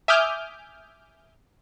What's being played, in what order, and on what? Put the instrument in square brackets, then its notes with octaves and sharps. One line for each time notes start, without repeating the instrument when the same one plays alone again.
[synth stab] E5 G#5 D6 D#6 F6 G6